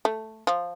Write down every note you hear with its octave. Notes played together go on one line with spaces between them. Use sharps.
A3
F3